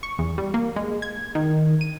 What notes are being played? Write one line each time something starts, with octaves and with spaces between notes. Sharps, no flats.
C#6
E2
G3
A#3
G#3
G#6
D#3
D#7